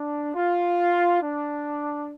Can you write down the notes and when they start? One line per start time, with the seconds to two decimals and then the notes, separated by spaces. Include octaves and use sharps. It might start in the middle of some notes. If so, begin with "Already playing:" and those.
Already playing: D4
0.34 F4
1.22 D4